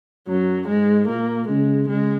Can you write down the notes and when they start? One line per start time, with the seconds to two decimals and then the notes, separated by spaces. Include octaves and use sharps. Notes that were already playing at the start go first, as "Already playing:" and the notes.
0.27 F#2 F#3
0.68 G#2 G#3
1.08 A#2 A#3
1.48 C#3 G#3
1.88 C#3 G#3